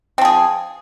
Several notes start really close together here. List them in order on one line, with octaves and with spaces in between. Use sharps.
C4 F3 G#4